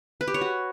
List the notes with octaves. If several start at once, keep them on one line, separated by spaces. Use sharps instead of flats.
B4
G4
C#5
F#4